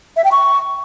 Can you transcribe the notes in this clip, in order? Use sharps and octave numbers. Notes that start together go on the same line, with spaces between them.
E5
G5
C#6